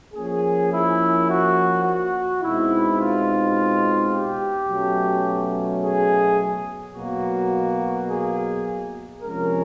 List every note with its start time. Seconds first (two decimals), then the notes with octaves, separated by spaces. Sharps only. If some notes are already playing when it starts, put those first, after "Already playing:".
0.14 F3 A#3 C#4 G#4
0.71 E4
1.28 F#4
1.85 F#4
2.42 B2 G#3 C4 D#4 E4
2.98 F4
4.12 G4
4.68 B2 F#3 A3 C#4
5.81 G#4
6.94 B2 F#3 A#3 F#4
8.08 G#4
9.21 C3 F3 G#3 C#4 A#4